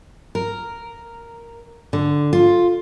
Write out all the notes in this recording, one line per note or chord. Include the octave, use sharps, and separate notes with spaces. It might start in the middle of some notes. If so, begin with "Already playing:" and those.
A#4
D3
F4